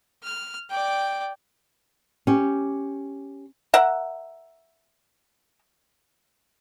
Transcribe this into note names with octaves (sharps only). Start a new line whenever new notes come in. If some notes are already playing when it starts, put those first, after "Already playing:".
F6
D5 G5
C#4 G4
A#4 E5 F#5